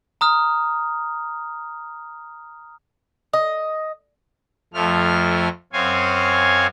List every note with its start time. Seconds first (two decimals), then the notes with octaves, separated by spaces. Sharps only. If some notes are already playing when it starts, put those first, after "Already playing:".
0.21 A#5 D#6 F6
3.33 D#5
4.74 F2 F3 A3 F6
5.73 F#2 C4 C#5 F5 G#5